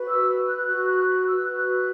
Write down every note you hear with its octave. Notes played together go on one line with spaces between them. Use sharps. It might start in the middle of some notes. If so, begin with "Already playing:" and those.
Already playing: F#4 B4
E6
F#6
F#4 B4 F#6
F#6
F#6
E6
F#4 B4 F#6